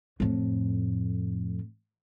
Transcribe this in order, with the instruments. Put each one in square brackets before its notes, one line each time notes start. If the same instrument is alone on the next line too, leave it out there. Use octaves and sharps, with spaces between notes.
[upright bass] F2 A2